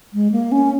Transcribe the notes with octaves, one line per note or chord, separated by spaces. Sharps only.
G#3
A#3
C#4